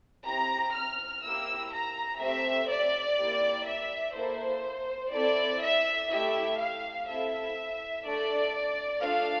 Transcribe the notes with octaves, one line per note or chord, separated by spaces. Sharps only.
C4 E4 G4 A#5
F6
A#3 E4 G4 E6
A#5
A3 C4 G4 E5
D5
A#3 E4 G4
E5
A#3 E4 A4 C5
C4 E4 A4 D5
E5
A3 E4 G4 E5
F5
C4 E4 A4 E5
A3 D4 A4 D5
A3 D4 F4 A4 F5